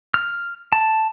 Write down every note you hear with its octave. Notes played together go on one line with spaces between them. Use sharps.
F6
A5